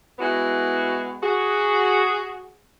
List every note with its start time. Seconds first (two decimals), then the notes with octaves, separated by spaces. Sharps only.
0.19 G#3 B3 E4 F#4
1.22 F#4 G#4